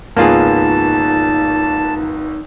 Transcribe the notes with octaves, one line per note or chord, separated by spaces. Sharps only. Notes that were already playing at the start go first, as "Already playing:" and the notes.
G#1 C#2 A#3 B3 D#4 F4 G#4 A5